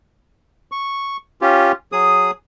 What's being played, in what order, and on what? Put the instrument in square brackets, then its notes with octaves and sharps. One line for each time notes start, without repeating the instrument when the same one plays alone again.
[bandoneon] C#6
C#4 F4 G4
F#3 G#4 D#6